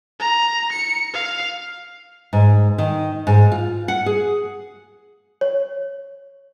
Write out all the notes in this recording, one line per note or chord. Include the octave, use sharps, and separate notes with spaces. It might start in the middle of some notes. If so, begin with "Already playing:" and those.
A#5
C#7
F5
G#2
D#3
G#2
F4
F#5
G#4
C#5